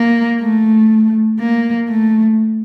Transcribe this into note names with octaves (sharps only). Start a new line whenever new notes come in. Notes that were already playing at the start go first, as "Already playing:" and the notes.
Already playing: A#3
A3
A#3
A3